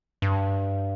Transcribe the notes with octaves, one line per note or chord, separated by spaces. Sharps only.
G2